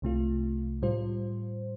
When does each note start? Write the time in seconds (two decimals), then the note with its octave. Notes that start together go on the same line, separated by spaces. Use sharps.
0.02 C2 C3 A3 F4
0.82 A2 G3 F4 C5